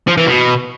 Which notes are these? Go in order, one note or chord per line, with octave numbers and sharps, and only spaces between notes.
F3
E3
B2